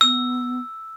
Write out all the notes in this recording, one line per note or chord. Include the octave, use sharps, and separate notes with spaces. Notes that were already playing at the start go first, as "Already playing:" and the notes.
B3 E6